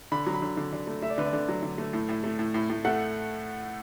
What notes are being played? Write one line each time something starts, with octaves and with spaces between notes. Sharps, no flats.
D3 B5
F#3
B5
D3
D3
D3
A3
A3 E5
D5
D3 B4
D5
D3
F#3
D3
A3
A2
A2
A3
A2
A2
A2
A3 F#5